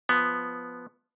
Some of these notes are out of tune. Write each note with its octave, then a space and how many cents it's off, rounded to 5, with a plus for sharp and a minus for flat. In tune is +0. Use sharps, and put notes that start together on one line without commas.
F3 +0 B3 +0